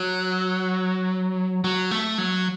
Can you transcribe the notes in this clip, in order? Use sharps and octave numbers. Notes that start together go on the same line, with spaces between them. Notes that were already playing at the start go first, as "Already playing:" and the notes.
Already playing: F#3
F#3
A3
F#3